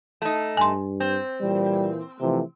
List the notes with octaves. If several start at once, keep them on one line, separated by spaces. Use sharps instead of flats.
A3 D#4
G2 G#5 C6
C4
A#2 E3 G3 A#3
C3 E3 F3 A3